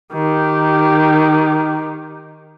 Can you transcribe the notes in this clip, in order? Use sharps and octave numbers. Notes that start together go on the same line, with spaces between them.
D#3 G4